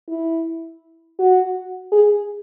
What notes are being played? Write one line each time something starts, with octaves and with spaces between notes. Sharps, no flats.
E4
F#4
G#4